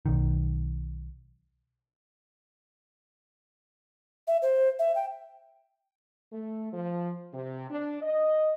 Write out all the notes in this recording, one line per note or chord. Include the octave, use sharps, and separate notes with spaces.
B1 D#3
E5
C5
E5
G5
A3
F3
C3
D4
D#5